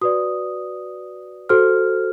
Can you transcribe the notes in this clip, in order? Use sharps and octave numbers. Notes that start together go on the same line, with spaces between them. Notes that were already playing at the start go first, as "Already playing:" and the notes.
F#4 B4 D5 D#6
F#4 A4 C5 F6